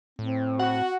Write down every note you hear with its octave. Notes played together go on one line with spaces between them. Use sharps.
A2 C4
F#4 F#5